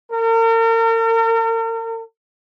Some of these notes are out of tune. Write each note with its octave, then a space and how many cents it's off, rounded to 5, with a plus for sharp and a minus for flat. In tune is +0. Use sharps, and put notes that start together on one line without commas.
A#4 -40